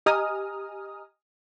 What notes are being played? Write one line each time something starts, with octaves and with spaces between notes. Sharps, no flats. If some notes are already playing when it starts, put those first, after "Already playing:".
G4 D#5 G#5 A#5 D#6 F6